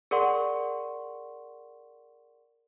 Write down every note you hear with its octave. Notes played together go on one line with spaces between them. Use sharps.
G#4 A#4 D5 F#5 C6 C#6